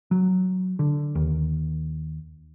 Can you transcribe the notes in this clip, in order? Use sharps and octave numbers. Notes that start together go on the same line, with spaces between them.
F#3
D3
D#2